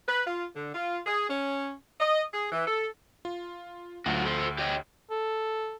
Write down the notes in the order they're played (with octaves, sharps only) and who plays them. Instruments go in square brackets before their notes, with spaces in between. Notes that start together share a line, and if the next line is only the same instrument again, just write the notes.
[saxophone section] B4
F4
D3
F4
G#4
C#4
D#5
G#4
E3
A4
[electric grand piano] F4
[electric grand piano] D2 [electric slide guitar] F#3 F4 F#4
[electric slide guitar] A4 C5
G4 C#5 D#5
[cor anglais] A4